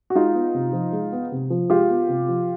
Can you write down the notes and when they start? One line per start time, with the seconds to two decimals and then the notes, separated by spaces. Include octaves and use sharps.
0.10 F#4
0.15 G#3 D#4 F4
0.34 B3
0.54 C3
0.73 F3
0.93 G#3
1.12 B3
1.32 C3
1.50 F3
1.70 G#3 F4 G4
1.89 B3
2.09 C3
2.28 F3